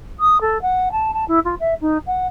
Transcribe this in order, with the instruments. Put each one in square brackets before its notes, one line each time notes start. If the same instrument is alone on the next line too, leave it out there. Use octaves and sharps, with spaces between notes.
[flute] D#6
A4
F#5
A5
A5
E4
F4
E5
D#4
F#5